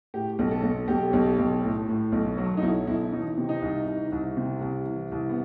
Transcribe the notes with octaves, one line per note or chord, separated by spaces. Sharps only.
A2 G4
B1
A4
B1
B1 G4
B1
B1
A2
A2
B1
F#3 F#4
D#4
B1 E4
B1 E4
E3 D#4
C3
D#4
C2
C2
C2
C3
C2
E3
C2
B3